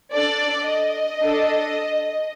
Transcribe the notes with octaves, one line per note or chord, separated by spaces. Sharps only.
D4 A4 D5
D#5
D4 A4